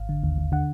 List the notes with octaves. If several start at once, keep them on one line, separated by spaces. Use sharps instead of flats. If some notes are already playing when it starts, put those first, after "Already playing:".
Already playing: G#1 F5
D3
D#2
D#2
D3 F#5